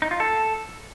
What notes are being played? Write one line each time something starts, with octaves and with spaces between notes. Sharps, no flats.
D#4
F4
A4